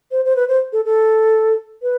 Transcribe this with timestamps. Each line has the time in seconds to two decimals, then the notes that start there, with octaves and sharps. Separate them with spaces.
0.11 C5
0.25 C5
0.36 B4
0.48 C5
0.73 A4
0.85 A4
1.82 B4